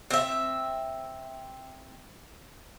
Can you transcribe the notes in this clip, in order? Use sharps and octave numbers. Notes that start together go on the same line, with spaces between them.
C4 E5